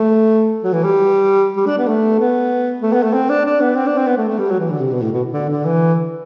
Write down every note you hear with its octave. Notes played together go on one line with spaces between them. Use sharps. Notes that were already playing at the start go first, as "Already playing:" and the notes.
Already playing: A3
F#3
E3
G3
G3
D4
B3
A3
B3
A3
B3
A3
C4
D4
D4
B3
C4
D4
C4
B3
A3
A3
G3
F#3
E3
D3
C3
B2
A2
B2
D3
D3
E3